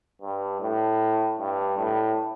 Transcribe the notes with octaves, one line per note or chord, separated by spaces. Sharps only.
G2
A2
G2
A2